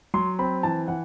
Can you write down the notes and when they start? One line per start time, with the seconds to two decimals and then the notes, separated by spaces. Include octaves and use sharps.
0.14 F#3 C6
0.39 C4 B5
0.63 E3 A5
0.88 E3 F#5